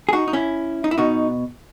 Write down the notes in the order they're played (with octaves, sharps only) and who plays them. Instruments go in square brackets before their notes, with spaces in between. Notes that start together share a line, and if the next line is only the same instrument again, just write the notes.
[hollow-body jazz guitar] G#4
D#4 F#4
D#4
C#4 E4
D#4
E4
B2 D#4 F#4